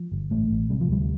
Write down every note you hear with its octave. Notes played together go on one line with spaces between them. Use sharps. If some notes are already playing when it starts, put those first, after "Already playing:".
Already playing: F3
G1
A1 A3
A1
C3 G3
F3
D2 G3